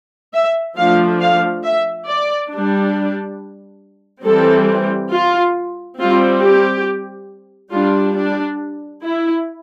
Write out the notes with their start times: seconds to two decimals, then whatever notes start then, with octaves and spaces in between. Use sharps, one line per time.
0.34 E5
0.77 F3 A3 D4 F5
1.21 F5
1.64 E5
2.08 D5
2.51 G3 D4
4.24 E3 G3 C4 A4
5.11 F4
5.98 G3 C4 F4
6.42 G4
7.72 G3 D4 F4
8.16 D4
9.03 E4